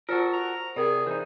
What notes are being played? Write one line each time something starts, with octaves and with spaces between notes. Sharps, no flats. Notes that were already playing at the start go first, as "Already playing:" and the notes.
F4 F#4 A4 A#4 C5
A#5
C3 G#4 A#4 D5
E3 D#4 C5